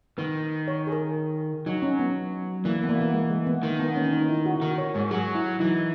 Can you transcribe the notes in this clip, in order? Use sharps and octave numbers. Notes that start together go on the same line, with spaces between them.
D#3 B4
C#5
G#4
A#4
F#3 D#4
C#4
B3
E3 A#3
B3
A#3
B3
G#3
G#3
B3
D#3 A#3
B3
C#4
D#4
E4
F#4
D#3 A#4
C#5
G#2 C#5
F#3 G#4
E4
E3 D#4